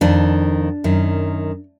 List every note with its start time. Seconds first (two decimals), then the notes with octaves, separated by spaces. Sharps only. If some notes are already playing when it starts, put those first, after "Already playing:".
0.01 F2 D#3 D4
0.84 F#2 D#3